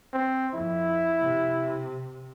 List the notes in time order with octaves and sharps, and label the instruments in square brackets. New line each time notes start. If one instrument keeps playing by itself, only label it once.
[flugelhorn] C4
[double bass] F2 [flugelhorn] E4
[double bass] C3